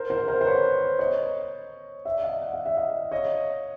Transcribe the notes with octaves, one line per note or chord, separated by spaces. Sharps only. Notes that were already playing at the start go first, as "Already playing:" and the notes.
Already playing: A#4 C5
A#4 C5
A#4 C5
C5
B4 C#5
C#5 D#5
D5 E5
D#5 F5
F#5
F5
E5
D#5 F5
C#5 D#5